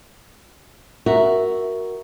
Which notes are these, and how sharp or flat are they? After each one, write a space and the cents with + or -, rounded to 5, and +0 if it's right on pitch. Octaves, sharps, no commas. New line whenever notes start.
F#4 +0 A#4 +0 E5 +0